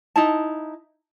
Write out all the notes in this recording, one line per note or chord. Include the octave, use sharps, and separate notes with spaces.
D#4 E4 A5